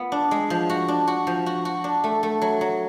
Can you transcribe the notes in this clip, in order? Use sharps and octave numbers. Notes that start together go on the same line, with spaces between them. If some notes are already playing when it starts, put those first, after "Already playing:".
Already playing: B3 F4
D4
G#3
F3
F#4
D4
F#4
F3
F#4
F#4
D4
A3
A3
F#3
F#3